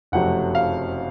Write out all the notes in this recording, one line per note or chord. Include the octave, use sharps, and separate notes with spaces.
F#1 F2 C3 F#3 A3 F#5
F5